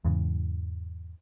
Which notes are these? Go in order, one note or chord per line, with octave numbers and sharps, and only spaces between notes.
E2 G#2 C#3 E3